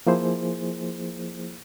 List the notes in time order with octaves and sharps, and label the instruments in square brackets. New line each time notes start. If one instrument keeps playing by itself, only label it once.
[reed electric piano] F3 A#3 E4 G#4 C5